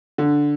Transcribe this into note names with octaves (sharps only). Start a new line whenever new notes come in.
D3